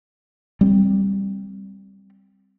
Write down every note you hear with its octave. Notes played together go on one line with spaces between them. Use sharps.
G3 C4